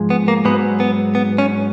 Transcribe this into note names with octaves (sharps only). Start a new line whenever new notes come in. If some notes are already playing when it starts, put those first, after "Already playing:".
Already playing: G#2 F3 G#3
B3
A#3
G#2 F#3 B3
B3
B3
C#4